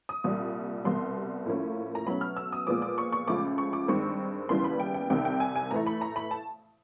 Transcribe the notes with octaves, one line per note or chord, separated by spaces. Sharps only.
D#6
C2 A#2 G3
C2 B2 G3 C6
A2 F3 A#3 C#4
A#5
B2 F#3 A3 C#4 B5
F6
E6
D#6
A#2 F3 G#3 B3 D6
D6
C#6
C#6
C#2 C#3 F3 A3 D6
C#6
D6
G2 D#3 G#3 C4 C#6
D#2 C#3 E3 G3 B3 C6
B5
G5
G5
C2 C3 D#3 G5
G5
G#5
G#5
A2 E3 A3 A#5
B5
A#5
B5
A5